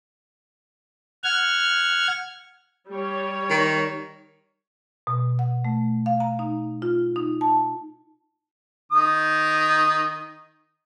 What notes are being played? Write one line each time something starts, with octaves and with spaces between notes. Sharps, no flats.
F#5 F6 G#6
G3 C#5
D#3
B2
F#5
A3
F5
A#5
D#4
F4
D#4
A5
D#3 D#6